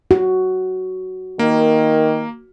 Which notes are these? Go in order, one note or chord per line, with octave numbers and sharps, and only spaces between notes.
F#4
D#3 A#3